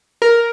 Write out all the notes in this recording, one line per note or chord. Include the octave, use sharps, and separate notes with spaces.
A#4